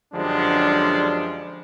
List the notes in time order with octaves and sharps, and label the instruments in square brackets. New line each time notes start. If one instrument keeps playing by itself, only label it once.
[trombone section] F#2 D3 F3 G3 G#3 D4